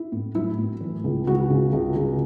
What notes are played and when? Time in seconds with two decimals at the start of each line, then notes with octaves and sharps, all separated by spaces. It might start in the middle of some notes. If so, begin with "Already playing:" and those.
Already playing: E4
0.12 A2
0.35 F#3 E4
0.58 A2
0.81 E3
1.04 C#2
1.27 C#2 F#4
1.50 C#3
1.73 C#2
1.96 C#2